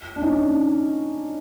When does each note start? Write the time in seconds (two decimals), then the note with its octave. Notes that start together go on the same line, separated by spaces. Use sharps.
0.16 D4
0.22 C#4 D#4